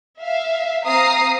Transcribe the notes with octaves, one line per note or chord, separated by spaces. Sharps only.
E5 F5
C4 F5 A#5 D#6 C7